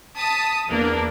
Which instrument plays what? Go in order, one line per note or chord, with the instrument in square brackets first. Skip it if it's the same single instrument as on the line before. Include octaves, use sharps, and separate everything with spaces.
[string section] A5 D#6 B6
E2 A#3 D4